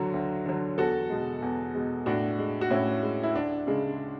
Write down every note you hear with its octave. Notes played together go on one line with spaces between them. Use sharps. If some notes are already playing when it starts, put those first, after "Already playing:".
Already playing: D2 D3 F#3 F#4
D2
D3 F#3
E2 F#4 A4
B2 G#3
E2
B2 G#3
A2 D4 F#4
G#3
F#4
A2 C#4 E4
G#3
E4
D2 D4
C#3 G#3